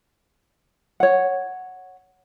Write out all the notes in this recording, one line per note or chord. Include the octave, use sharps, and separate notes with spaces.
C#5 F#5